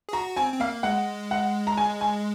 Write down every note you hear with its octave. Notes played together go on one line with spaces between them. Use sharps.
G#4
F#4 A#5
C4 G#5
C4
A#3 F5
G#3 F#5
F#5
A#5
G#5
G#5